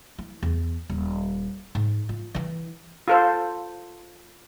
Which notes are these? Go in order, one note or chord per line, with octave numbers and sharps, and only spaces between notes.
E4
E2
D#1
G#2
F4
E3 E4
F4 A4 C5